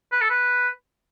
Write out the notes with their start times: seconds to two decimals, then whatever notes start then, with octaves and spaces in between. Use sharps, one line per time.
0.12 B4
0.22 A4
0.30 B4